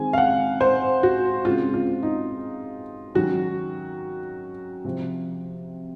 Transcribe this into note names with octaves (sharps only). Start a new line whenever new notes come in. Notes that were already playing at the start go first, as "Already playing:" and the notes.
Already playing: D#3 G#3 C4 G#5
F5
F#5
C5
F#4
C#3 G#3 C4 F4
F4
D#4
D#3 F#3 C#4 F#4
C3 F3 C4